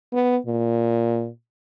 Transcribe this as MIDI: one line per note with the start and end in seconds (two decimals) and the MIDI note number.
0.13 0.37 59
0.46 1.28 46